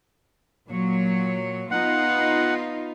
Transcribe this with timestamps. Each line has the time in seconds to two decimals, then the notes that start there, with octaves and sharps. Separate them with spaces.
0.67 A#2 F#3 C#5
1.71 B3 D#4 F4 F#5